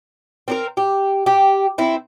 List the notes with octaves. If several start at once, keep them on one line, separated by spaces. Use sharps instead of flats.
C4 D4 A#4
G4
G4
C4 E4